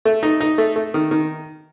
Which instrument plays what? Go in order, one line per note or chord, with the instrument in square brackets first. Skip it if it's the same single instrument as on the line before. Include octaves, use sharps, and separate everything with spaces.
[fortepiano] A3
D#4
D#4
A3
A3
D#3
D#3